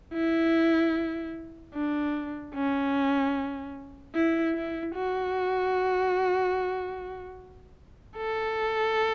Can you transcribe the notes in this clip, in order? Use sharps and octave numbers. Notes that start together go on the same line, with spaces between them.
E4
D4
C#4
E4
E4
F#4
A4